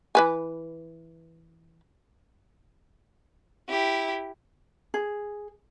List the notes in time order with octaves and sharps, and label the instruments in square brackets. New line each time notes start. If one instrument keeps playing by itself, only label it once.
[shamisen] E3 B4 G#5
[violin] E4 G4
[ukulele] G#4